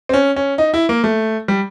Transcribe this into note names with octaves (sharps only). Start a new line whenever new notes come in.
C4
C#4
C#4
D#4
E4
A#3
A3
G3